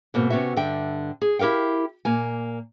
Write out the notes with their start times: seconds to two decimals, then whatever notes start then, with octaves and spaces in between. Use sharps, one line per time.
0.14 G#2 B2 A#3 C4
0.30 C3 B3 C#4 F#4 E5
0.56 G2 D3 E5 G5
1.21 G#4
1.39 E4 G4 A#4 F5 G5
2.05 A#2 A#3 G#5